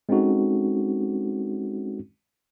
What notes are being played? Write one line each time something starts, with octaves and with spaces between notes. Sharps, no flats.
G#3 C4 C#4 D#4 F#4 A4